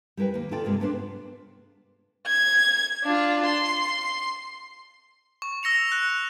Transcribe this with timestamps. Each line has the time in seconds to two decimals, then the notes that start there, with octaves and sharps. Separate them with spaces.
0.17 G3 E4 A#4 B4 G5
0.34 D#2 A#3
0.51 C#3 F4 A4 D5 G5
0.64 G2 C3 G#3 A#3 A#4
0.80 A#3 B3 C#4 D4 C5
2.27 G#6
3.04 D4 F4
3.45 C6
5.42 C#6
5.63 E6 A#6 C#7 F7
5.92 F#6 C#7